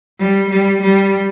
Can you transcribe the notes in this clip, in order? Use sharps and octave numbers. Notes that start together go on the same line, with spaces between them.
G3
G3
G3